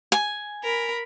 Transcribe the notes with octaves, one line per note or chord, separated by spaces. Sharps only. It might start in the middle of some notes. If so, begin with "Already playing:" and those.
G#5
A#4 B5